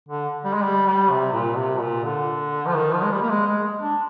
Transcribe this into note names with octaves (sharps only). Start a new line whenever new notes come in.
D3
G3
G#3
G3
G3
C3
A#2
C3
A#2
D3
F3
D#3
F3
G#3
G3
A#3
G#3
G#3
D4